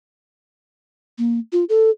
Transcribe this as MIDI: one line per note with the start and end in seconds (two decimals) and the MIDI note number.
1.18 1.39 58
1.53 1.64 65
1.69 1.90 69